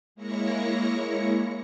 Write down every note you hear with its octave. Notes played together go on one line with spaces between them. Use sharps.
G#3 A#3 E4 C#5 A#6 C#7